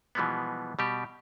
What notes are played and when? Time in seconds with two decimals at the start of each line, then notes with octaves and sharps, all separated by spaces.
0.15 B2 E3 F3 G3 G#3 B3
0.79 B2 G3 G4